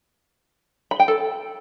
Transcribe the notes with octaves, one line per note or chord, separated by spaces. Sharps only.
B5
G5
A4